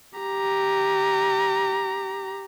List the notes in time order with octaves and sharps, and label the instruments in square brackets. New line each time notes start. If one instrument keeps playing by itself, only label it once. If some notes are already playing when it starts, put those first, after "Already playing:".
[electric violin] G4 A#5